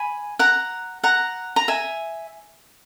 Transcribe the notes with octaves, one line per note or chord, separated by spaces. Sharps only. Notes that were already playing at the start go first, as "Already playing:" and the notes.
Already playing: G#5 B5
F#5 A#5
F#5 A#5
A#5
E5 G#5